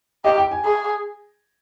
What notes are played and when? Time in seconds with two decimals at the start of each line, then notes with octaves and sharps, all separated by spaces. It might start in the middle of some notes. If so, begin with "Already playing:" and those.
0.24 G4 D#5
0.38 G5
0.51 G#5
0.65 G#4